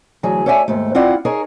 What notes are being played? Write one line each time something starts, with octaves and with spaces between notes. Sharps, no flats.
D2 E3 F#3 G#4
A4 C#5 D5 E5 F#5 G#5
D#2 G#2 A3
C4 E4 F4 D5 F#5
D#4 G#4 A#4 C#5